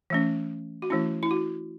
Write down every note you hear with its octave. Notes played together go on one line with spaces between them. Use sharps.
E3 A3 C#4
F#4
E3 A3 C#4 E4
E4
F#4